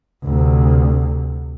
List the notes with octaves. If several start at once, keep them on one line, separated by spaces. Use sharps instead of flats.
D2 C3